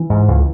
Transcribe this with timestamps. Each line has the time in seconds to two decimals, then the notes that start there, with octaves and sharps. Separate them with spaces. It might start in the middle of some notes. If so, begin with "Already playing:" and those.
Already playing: E3
0.10 G#2
0.28 C#2